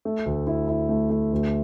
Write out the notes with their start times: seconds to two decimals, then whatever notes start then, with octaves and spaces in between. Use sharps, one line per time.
0.05 A3
0.26 D2
0.47 E4
0.68 E4
0.89 A3
1.10 A3
1.32 D2